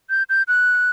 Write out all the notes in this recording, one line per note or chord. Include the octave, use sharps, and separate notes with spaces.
G6
G6
F#6